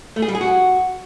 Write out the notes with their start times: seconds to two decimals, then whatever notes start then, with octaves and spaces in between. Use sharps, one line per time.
0.16 A3
0.22 G#4
0.29 G3
0.35 G#4
0.41 F#4